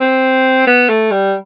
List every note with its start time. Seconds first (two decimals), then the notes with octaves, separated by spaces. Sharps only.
0.01 C4
0.67 B3
0.89 A3
1.11 G3